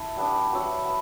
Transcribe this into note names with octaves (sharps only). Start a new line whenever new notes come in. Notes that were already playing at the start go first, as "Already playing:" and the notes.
Already playing: A3 E4
G3 B3 D4
B3 F#4 C#5 E5
B3